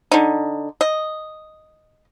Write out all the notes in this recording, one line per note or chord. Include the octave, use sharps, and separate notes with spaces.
D3 D#4
D#5